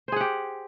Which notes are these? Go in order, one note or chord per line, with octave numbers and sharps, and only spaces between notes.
G4 G#4 C5 F#5